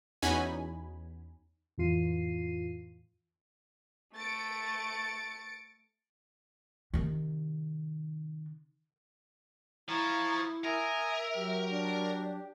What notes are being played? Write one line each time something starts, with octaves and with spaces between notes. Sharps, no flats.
E2 C#4 D#4 F#4 G#5 B5
F2 A2 E3 F4 C7 D#7
A3 A6 C#7 D7
C3 D#3
F3 E4 A#5 C#6 G#6 A6
A#4 E5 G#5 A#5 D#6
F#3 G4
D4